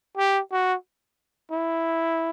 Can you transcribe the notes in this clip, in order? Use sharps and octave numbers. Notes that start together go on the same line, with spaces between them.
G4
F#4
E4